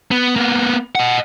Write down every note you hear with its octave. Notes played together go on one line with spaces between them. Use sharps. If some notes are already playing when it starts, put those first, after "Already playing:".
B3
A#3 B3
D#5 F#5